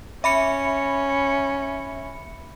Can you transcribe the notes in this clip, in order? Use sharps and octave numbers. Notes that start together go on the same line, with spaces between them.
C#4 E5 B5 C#7